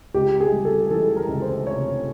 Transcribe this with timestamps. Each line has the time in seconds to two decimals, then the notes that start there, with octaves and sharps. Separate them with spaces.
0.14 C#2 G4
0.40 G#4
0.52 G3
0.65 A4
0.90 E3 A4
1.17 A#4
1.29 C#2
1.42 C5
1.67 C3 C#5